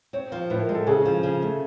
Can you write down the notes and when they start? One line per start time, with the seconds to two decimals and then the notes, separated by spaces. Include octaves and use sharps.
0.13 C4 C#5
0.32 F3 C5
0.50 A2 B4
0.62 A#4
0.69 G#3
0.75 A4
0.87 C#3 G#4
1.05 F3
1.23 C#3
1.42 A3